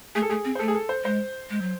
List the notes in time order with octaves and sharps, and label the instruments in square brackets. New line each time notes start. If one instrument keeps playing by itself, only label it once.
[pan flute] A3 [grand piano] G#4
[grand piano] A4
[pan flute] A3 [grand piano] G#4
[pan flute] C4
[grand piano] C5
[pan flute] A3 [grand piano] A4
[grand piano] G#4
A4
C5
[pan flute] G#3 [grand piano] C5
[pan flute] G#3
F#3